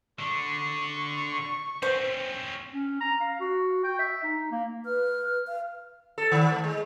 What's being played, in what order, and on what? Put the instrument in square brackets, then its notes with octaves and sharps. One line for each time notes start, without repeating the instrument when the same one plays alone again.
[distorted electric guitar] D3 [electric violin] C#6
[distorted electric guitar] C4 C#4 [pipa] C5
[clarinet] C#4
A#5
F5
F#4
G5
E5
D#4
A#3
[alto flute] B4 [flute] F6
[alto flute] F5
[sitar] A4
D#3
A3
G#3